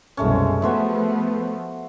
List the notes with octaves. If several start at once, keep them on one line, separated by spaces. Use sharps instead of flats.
C2 F#2 B2 G#3 A3 C#4
F3 A3 B3 F#4 C5 E5